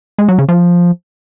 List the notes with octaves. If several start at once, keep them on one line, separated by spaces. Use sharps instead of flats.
G#3
F#3
C#3
F3